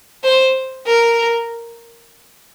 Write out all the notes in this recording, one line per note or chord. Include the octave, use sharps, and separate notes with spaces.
C5
A#4